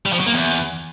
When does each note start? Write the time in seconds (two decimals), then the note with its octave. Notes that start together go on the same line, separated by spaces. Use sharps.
0.06 G3
0.13 F3
0.20 F#3
0.26 A#3
0.33 E2